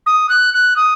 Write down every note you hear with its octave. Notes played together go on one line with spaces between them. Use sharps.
D#6
F#6
F#6
D#6